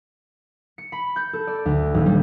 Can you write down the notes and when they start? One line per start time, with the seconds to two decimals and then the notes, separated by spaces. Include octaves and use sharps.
0.78 C#7
0.92 B5
1.16 G6
1.33 A4
1.47 D5
1.66 D2
1.94 D#1
2.06 G3